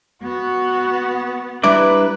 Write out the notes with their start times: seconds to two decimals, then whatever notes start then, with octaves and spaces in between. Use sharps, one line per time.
0.23 B3 F#4
1.63 G3 D4 E4 B4 D5 A#5